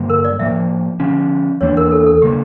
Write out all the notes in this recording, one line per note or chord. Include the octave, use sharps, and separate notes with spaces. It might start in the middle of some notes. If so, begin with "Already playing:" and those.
Already playing: G2 D3 G3 A#3
A#4
D5
A2 F3 A#3 E5
D3 F3 C#4
E2 E3 A#3 D4 C#5
A#4
A4
A4
C#3 G3 A#3 G4